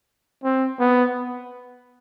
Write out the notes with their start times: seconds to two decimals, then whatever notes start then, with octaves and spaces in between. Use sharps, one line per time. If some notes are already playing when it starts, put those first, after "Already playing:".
0.44 C4
0.80 B3